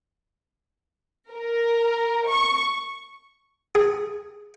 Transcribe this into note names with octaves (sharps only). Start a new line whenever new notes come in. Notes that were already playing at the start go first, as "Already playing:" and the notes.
A#4
C#6
G#4